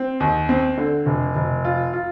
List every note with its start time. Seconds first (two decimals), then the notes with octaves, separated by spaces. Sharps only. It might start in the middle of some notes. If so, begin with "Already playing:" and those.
Already playing: C4
0.20 D#2
0.49 C4
0.78 D3
1.06 F1
1.36 F1
1.65 F4
1.93 F4